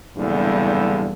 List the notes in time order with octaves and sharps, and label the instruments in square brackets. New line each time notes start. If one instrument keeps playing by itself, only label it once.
[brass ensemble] F#1 E2 G2 B2 D3 G3